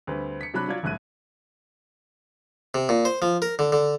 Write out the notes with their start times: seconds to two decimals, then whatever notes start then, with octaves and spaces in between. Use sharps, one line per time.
0.07 D2 G3 C4 B4
0.41 B6 C#7
0.54 C3 F#3 D4 B5 F#6
0.68 F#3 F4 D5 G#6
0.83 F#1 C2 A2 F#6 D#7
2.74 C3
2.89 A#2
3.05 C5
3.22 F3
3.42 A#4
3.59 D3
3.72 D3